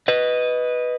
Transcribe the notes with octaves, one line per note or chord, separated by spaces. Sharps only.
B4 D#5